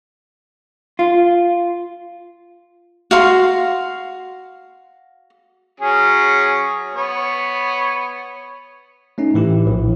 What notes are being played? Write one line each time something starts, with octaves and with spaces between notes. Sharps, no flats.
F4
F#4 F5 C6
F#3 C#4 G#4
B3 C#5
A3 C#4 D#4
A2 E3 E4 G4
A#1